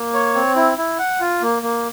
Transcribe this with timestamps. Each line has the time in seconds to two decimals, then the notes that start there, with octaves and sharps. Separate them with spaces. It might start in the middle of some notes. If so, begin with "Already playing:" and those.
Already playing: A#3
0.14 C#5
0.35 C4
0.56 E4
0.77 E4
0.99 F#5
1.21 F4
1.42 A#3
1.62 A#3